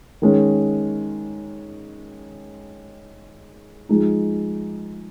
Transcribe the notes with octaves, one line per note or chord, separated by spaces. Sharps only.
D#3 G#3 C#4
F3 G#3 D#4